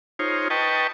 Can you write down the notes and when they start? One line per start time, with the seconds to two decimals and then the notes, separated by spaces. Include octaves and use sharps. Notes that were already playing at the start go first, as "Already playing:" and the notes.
0.19 D#4 F4 G#4 C5 C#5
0.50 B4 D#5 G5 A5 C#6